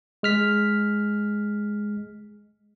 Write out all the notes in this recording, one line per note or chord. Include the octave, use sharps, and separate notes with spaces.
G#3 F6 B6